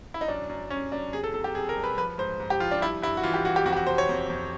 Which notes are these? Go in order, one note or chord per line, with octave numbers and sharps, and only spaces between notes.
E4
D#4
F#2 D4
F#2
F#2 C#4
F#2 D4
C3 G#4
A4
C3 A4
G4
C3 G#4
A#4
G3
B4
F3 B4
G#2 C5
G#2
G4
F3 F4
D4
G3 E4
G2 E4
F#4
E3 F4
G4
E3 F#4
G4
F2 F#4
G4
F#4
C3 C5
C#5
F2
F2